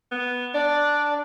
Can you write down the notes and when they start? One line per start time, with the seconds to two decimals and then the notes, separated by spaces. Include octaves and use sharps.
0.12 B3
0.54 D4 D5